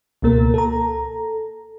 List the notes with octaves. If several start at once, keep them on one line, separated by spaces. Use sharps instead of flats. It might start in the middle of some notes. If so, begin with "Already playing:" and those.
C#2 B2 A#3 A#4
A4 A#5